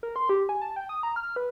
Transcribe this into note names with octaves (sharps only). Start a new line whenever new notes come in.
A#4
C6
G4
G#5
A5
G5
D#6
A#5
F6
B4